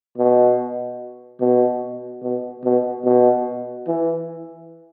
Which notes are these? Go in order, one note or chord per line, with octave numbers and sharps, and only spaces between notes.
B2
B2
B2
B2
B2
E3